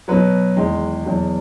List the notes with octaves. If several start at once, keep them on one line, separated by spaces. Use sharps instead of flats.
B2 F#3 B4
E2 D#3 G#3
E2 B2 F#3